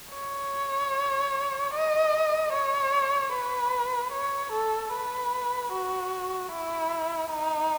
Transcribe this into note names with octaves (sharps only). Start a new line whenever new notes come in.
C#5
D#5
C#5
B4
C#5
A4
B4
F#4
E4
D#4